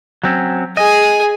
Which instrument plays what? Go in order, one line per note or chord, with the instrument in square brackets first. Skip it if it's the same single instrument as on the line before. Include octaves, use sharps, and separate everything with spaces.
[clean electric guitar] F#3 C4 C#4
[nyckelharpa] G#4 [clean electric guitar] D#5 [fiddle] G#5